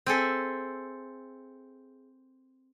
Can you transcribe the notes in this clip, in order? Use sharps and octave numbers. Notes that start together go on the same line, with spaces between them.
C4 G#4 A4 E5